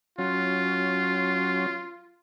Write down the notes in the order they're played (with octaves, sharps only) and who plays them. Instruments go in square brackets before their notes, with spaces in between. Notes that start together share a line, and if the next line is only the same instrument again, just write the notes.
[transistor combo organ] F#3 C#4 [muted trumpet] F4